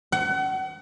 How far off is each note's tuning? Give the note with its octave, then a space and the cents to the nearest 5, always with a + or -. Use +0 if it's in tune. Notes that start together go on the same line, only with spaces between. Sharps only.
F#5 +35